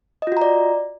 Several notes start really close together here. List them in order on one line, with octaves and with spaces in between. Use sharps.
D#5 F4 F#4 A#5 D5